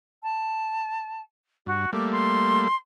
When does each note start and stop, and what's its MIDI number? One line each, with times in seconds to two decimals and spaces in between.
0.23 1.21 81
1.66 1.86 43
1.66 1.90 66
1.93 2.68 55
1.93 2.68 57
1.93 2.68 58
1.93 2.11 86
2.11 2.76 84